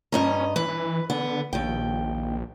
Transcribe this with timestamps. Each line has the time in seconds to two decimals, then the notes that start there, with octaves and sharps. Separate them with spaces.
0.12 G2 C#4 D#5 A#5
0.56 E3 B4
0.68 E3
1.10 D3 B3
1.53 A#1 D#2 G5